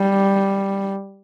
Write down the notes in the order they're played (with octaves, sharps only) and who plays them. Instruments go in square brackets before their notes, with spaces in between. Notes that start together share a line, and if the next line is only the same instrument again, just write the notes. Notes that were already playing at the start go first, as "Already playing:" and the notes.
Already playing: [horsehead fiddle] G3